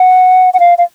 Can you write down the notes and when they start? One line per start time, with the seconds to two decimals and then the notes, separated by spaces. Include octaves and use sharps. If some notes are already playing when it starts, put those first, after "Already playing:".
Already playing: F#5
0.54 F#5
0.60 F5
0.78 F5